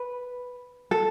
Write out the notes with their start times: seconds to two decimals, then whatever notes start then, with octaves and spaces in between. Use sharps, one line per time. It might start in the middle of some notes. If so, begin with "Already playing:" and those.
Already playing: B4
0.91 A4